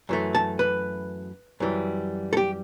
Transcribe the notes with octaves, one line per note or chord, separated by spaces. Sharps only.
F#2 E3 A3
A5
B4
F#2 E3 G3
A4
G4